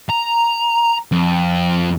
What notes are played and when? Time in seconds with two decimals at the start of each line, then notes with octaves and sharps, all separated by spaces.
0.10 A#5
1.12 F2